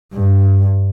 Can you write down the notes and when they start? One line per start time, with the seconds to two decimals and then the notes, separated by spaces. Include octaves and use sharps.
0.14 G2